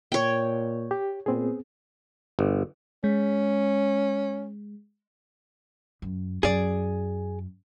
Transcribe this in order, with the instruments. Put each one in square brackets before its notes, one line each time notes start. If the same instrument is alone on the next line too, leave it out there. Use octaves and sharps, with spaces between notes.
[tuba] A#2 [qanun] C#5 G5
[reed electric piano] G4
[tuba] A#2 [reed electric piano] B3 C4 G#4
[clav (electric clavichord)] G1
[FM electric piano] G#3 [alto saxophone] C#4
[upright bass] F#2
[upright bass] F#2 [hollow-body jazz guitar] G#4 D5